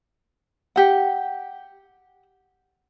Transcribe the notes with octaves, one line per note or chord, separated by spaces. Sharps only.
G4 F#5